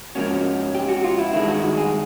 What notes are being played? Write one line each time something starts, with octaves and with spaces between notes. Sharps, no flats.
G#2 F3 A#3 C#4 F#4
G4
F#4
F4
E4
G2 D#3 G#3 E4
F#4
G#4